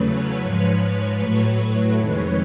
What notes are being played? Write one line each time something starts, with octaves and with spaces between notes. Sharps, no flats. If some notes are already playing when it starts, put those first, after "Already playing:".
Already playing: E2 C#3 F#3 A3 B4 C#5
G#2 F3 G#3 B4 C#5
A2 F#3 A3 B4 C#5
F2 C3 D#3 G#3 B4 C#5